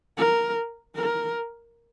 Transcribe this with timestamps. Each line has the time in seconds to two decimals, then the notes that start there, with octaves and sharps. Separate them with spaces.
0.18 A#4
0.95 A#4